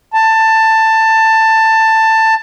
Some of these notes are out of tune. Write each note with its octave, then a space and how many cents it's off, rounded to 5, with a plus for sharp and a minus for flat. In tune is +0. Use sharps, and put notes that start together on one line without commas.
A5 +15